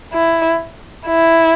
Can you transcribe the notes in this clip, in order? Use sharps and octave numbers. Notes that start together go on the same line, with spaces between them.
E4
E4